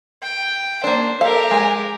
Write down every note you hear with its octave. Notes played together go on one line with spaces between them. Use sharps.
G5
A#3 D4 C5
G4 A4 A#4 F5
G#3 G#5